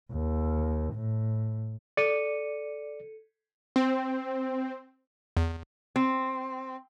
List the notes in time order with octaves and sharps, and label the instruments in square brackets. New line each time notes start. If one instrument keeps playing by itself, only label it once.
[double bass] D#2
A2
[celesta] A4 C#7 D#7 [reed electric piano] D5
[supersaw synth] C4
[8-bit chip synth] E2
[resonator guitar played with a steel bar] C4